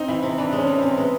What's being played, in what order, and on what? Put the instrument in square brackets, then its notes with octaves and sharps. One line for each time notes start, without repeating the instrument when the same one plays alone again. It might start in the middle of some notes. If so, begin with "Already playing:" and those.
Already playing: [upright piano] C4 D#4
[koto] E3 [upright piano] E4
[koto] C3
[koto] E3 [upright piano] D4
[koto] G#3 [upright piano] C#4
[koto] E3
[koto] C3 [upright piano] C4
[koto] G#3 [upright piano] B3